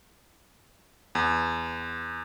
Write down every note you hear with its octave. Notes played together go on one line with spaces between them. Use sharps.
E2